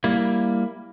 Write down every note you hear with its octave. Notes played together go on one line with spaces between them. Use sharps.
G3 A#3 E4